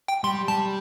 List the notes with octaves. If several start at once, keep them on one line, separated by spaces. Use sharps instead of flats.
G5
G3 C6
G3 A5